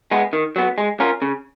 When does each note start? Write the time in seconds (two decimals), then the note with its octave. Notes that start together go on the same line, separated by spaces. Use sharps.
0.11 G#3 B3
0.33 D#3
0.56 F#3 B3
0.78 G#3
1.00 C#4 F4 A#4
1.22 C#3